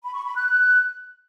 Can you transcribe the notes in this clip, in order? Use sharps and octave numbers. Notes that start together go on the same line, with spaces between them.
B5
C#6
B5
F#6
F#6